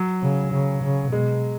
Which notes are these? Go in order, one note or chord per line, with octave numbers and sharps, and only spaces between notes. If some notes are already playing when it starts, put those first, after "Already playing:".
Already playing: F#3
C#3
C#3
C#3
B2 G#3